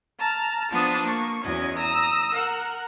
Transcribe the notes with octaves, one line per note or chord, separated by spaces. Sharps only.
A5 A#5 F6
F3 B3 D4 D#6 A6
A#3 C#6
E2 C#4 F#4 D#5 G#6
A#5 D#6 E6 A#6
A#4 F#5